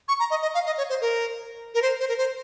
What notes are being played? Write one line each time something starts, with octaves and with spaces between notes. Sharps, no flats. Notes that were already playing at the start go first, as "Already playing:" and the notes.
C#6
A#5
D#5
D#5
F5
D#5
C#5
C5
A#4
A#4
C5
C5
A#4
C5